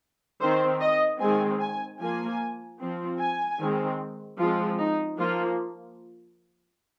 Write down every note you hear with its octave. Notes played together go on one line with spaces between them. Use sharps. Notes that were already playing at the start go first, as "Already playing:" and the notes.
D#3 C4 C5
D#5
D#3 G#3 C4 G#5
G#5
F3 A#3 G#5
F3 C4
G#5
D#3 G#3 C4
F3 G#3 C4 F4
D#4
F3 A#3 F4